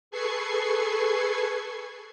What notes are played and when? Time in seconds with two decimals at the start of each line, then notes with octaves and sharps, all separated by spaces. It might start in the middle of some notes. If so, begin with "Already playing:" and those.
0.11 G#4 A4 B4 C#6 G#6 C7